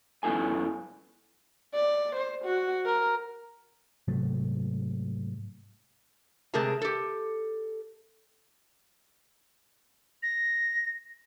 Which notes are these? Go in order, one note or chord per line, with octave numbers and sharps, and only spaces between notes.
F#2 B3 E4 A4 G#5
D5
C5
F#4
A#4
G#2 C3 F#3 A3
C3 G#3 A3 G#4 A#4 A5
G4 A4
A#6